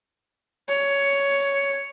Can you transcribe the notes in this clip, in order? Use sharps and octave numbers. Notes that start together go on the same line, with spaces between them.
C#5